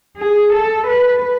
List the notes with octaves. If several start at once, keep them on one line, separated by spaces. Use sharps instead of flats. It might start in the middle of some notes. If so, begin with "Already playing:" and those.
G#4
A4
B4